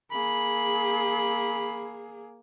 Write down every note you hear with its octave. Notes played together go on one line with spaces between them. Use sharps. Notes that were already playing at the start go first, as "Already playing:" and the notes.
A#3 G#4 B5